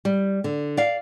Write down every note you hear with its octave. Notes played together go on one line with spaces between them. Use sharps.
G3
D3
D5 F5